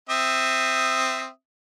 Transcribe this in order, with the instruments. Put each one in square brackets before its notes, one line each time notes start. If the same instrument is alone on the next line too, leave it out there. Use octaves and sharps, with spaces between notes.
[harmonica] C4 E5 D#6